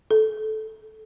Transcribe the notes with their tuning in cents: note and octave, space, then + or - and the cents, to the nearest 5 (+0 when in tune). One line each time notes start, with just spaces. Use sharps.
A4 -10